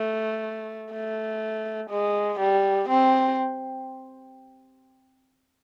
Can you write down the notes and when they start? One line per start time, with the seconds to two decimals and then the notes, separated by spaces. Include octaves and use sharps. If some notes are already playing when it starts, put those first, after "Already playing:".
Already playing: A3
0.92 A3
1.90 G#3
2.40 G3
2.89 C4